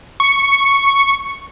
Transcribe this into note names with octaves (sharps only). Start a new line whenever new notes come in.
C#6